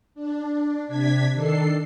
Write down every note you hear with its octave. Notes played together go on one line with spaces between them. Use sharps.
D4
C3 D4 G#6 B6
D#3 D4 A4 C7